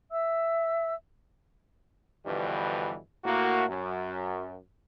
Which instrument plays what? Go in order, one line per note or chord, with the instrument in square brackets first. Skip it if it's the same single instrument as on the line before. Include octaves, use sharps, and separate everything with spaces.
[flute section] E5 E6
[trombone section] G2 B2 D3 E3 F3 G3
A2 A#3 F#4
F#2